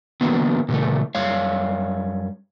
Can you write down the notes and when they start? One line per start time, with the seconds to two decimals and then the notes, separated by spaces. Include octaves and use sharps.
0.21 D3 E3 F#3 A#3 B3
0.69 A#2 C#3 E3 A3
1.15 F#2 G3 C#5 F5